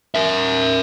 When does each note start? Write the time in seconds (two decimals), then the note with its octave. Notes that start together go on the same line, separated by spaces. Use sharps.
0.15 A#4 E5